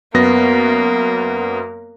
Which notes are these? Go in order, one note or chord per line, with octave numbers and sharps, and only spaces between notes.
F#2 A#3 B3 A#6